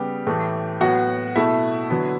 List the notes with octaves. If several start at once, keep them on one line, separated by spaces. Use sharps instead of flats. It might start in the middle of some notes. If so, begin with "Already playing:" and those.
Already playing: C#3 G3 B3 G4
A2 E3 A3
A2 F#3 B3 F#4 F#5
B2 A3 E4 E5
D3 F#3 B3